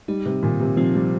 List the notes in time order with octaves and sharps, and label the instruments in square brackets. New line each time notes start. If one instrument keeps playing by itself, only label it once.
[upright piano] G3 [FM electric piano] D#4
[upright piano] C3
[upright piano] A#2 [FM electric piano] D#3
[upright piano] C3
[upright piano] F3 [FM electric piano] C4
[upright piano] G3